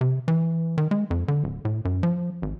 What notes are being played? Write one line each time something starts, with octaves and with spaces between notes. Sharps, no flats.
C3
E3
D#3
G#3
F2
D3
D1
A2
F#2
F3
G#1